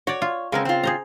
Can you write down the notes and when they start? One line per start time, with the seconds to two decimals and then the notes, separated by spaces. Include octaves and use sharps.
0.07 F#4 C#5 D5
0.22 F4
0.52 C#3 G#3 B3 C4 A#4
0.65 C4 F4
0.83 G#4 C5 A#5